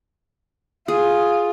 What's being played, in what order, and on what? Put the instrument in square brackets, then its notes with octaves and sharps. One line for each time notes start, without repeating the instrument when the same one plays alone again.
[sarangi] F4 [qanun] G#4